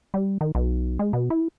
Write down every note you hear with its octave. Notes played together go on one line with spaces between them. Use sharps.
G3
D#3
B1
G#3
B2
E4